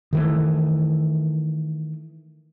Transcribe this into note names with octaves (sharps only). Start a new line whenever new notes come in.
D#3 E3 A3